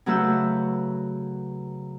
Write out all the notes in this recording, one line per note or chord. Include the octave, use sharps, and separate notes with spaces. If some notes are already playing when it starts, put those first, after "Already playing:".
C#3 F#3 A3 B4 E6 G6